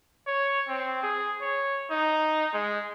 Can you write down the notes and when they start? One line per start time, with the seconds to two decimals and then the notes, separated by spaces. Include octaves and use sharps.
0.27 C#5
0.69 C4
1.03 G#4
1.42 C#5
1.91 D#4
2.53 G#3